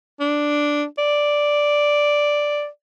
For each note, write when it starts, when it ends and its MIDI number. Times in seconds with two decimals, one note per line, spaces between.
0.20 0.84 62
0.98 2.67 74